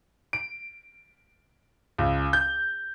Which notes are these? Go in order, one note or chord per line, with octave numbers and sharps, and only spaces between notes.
D7
C#2
G6